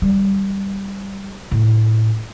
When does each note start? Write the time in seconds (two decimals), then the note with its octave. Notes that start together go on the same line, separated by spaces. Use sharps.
0.02 G3
1.51 A2